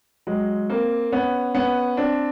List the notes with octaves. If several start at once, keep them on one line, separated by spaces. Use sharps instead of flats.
F#3 G#3
A#3 C4
B3 C#4
B3 C#4
C4 D4